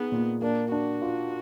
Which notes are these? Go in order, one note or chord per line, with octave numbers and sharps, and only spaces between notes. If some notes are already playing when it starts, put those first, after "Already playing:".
Already playing: B3 D#4 G#4
A#2
A#3 D4
D4 F#4
F4